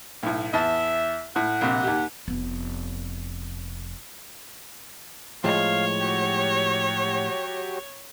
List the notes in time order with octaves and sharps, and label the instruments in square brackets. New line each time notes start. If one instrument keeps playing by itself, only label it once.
[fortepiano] B1 A2
[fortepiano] E2 A5 [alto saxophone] E5
[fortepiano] A2 [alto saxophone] F#5
[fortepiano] A#1 C3
D#2 G4
[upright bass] F1 B3
[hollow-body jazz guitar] A2 F3 G#3 [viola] C#5 [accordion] F5
[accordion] F#3 F#4 G4